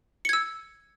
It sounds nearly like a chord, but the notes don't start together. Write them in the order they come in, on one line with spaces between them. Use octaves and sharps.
C#7 G#6 E6